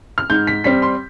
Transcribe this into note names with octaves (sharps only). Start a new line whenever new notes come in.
F6
G#2 G6
B6
G3 C4 B6
C6